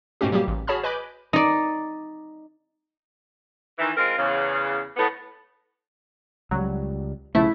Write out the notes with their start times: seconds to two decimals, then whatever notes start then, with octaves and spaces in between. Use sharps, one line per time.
0.21 G#2 B2 A3 C#4 G4
0.32 F#3 G3 A#3 G4
0.48 A1
0.67 F#4 G#4 C#5 A5 B5 F6
0.83 B4 D#5 G#5 B5 D6 G6
1.33 D#4 D5
3.78 D#3 E3
3.97 G#3 C4 F4 A#4
4.17 E2 C#3
4.96 A2 B3
6.51 C#2 F#3 G3
7.35 B1 C#3 F3 A3 E4